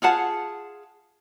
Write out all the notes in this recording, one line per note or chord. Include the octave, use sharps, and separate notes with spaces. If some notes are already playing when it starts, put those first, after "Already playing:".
F4 G#4 F#5 A5